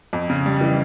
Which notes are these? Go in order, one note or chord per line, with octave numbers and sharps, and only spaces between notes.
F2
C#3
G3
E3